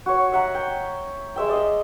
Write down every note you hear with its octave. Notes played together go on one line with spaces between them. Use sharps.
F#4 C#5
E5 F#5 A#5
G5
G#3 E5 G5
D5 D#5 F5